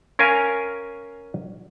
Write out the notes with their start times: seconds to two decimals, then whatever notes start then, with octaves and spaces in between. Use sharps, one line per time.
0.19 C#4 A#4 F5 G#5